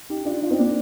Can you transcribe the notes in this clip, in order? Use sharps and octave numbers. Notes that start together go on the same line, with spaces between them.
D#4 G4
D4 F4
D4 F4
C4 D#4
A#3 D4